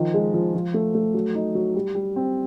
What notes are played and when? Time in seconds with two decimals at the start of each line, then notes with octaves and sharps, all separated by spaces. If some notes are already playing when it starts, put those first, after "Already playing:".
Already playing: D#3 F3
0.14 G#3
0.34 F3
0.55 F3
0.74 A3
0.95 A3
1.14 F#3
1.35 D#4
1.55 F#3
1.75 G3
1.95 G3
2.16 C4